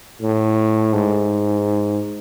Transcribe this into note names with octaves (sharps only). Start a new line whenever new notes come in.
A2
G#2